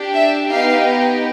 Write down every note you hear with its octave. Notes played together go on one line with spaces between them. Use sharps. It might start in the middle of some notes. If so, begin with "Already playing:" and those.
Already playing: D4 G4
E5
B3 D#4 G4 F5